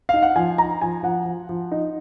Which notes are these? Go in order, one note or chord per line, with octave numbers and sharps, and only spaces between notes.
D#4 F5
F#5
F3 G#5
D#4 A#5
F3 G#5
F3 F#5
F3
F3
D#4